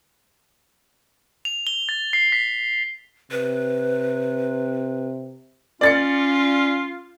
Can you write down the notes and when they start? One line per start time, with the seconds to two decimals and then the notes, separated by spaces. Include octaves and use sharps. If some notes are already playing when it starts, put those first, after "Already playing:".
1.45 F7
1.67 G7
1.89 A6
2.13 C7
2.32 B6
3.31 C3 B4
5.81 C#4 F4 D5 A6 C#7